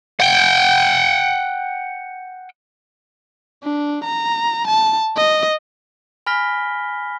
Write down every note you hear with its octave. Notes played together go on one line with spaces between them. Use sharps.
F#5 G5
D4
A#5
A5
D#5
G#5 B5 F6 A#6 B6 G7